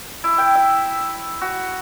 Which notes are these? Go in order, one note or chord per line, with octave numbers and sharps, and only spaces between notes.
E4
G5
E5
F#4